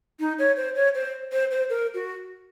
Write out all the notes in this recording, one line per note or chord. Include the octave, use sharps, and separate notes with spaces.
D#4
C#5
C5
C#5
C5
C5
C5
A#4
F#4